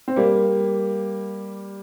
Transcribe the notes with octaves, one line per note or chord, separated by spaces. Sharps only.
C4
G3 A#3